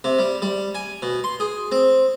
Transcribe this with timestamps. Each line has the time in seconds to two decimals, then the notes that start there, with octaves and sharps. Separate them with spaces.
0.04 C3
0.19 G3
0.42 G3
0.75 G#5
1.02 B2
1.24 C6
1.40 G#4
1.72 C4